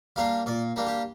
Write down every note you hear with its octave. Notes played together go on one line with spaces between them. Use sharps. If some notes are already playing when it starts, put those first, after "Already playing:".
G3 A#3 D4 F5
A#2 D5
G3 A#3 D4
G4